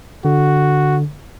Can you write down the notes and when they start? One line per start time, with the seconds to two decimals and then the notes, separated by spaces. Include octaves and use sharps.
0.25 D3 F#4